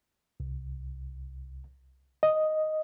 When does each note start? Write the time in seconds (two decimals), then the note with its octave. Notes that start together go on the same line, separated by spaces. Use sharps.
0.40 C2
2.23 D#5